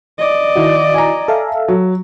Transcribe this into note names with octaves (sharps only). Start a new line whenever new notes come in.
D5 D#5
D#3 E4 F#4
G#5 A#5
A4 E5 F5
F#3